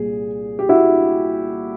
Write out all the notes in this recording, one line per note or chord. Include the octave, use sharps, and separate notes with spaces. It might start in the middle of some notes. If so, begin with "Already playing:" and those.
Already playing: C2 A#2 G#4
G4
E4 F#4